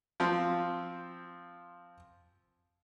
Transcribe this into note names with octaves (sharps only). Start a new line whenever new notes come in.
F3 C4